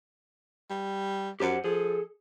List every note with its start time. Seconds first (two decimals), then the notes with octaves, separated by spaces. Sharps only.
0.70 G3
1.40 F#2 G4 C5 F#5
1.64 F3 G#4 A4